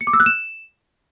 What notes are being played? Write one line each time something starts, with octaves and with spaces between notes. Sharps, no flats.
C#7
D6
E6
F#6
E7